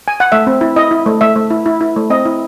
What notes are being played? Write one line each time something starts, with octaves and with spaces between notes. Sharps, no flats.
G#5
F#5
A3 E5
C4
E4
E4 D#5
E4
A3
A3 E5
A3
E4
E4
E4
A3
C4 D#5
E4